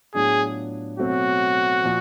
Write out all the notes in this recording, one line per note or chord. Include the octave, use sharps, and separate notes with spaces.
A2 F#3 B3 D4 F4 G#4
B2 F#3 A3 C4 F#4
A#2 F3